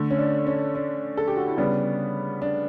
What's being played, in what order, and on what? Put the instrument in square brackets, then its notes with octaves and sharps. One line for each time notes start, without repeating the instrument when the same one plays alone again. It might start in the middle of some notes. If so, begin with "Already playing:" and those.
Already playing: [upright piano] D3 A3
C#4
D4
C#4
D4
A4
G4
F#4
E4
C#3 G3 B3 D4
D4